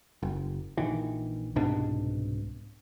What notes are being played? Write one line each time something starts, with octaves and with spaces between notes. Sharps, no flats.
F#1
A#1 D#3 E3
C2 G#2 B2 D4